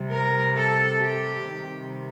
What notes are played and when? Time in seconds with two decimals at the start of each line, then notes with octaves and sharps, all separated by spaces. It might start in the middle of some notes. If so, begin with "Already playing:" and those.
Already playing: C3 G3
0.09 A#4
0.55 A4
1.02 G4
1.48 C3 D#3 G3